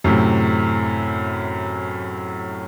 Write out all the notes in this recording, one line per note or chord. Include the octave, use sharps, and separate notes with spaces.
F#2 A2 C3